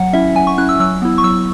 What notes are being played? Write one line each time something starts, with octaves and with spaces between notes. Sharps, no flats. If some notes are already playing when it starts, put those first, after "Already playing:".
Already playing: F#3 F#5
C#4 E4 E5
F#3 G#5
C#6
C#4 E4 F#6
E6
F#3 E6
B3 E4
C#6
F#3 E6